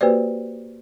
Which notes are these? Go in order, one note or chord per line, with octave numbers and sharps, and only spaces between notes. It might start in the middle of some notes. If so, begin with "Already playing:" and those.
A#3 F#4 G4 B4 C5 D5